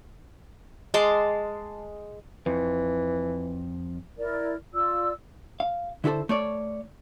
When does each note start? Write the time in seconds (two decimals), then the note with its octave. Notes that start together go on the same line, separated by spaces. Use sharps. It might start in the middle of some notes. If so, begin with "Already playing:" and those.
0.94 G#3 A5 C6 D6
2.46 F2 E3
4.17 E4 A#4 D5
4.74 F4 D5 E6
5.60 F5
6.04 D3 E4 F#4 A4 C5
6.29 A3 C#5 D5